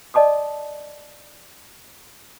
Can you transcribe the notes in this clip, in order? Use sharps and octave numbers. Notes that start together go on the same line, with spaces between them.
D5 D#5 A5 D6 D#6